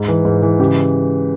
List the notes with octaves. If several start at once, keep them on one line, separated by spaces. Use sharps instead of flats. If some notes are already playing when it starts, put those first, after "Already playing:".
Already playing: G#2
E3
G#2
E3
C#3 G4